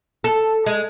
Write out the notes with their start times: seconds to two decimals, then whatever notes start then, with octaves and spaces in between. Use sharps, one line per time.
0.24 A4
0.66 G#3